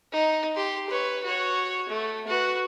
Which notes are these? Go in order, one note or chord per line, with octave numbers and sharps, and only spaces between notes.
D#4
G4 C6
B4 C#5
F#4 C#5
A3
F#4 B4